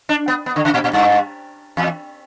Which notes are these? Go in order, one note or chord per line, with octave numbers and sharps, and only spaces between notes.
D4
B3
B3
D3
C#3
A#2
A#2
G2
E2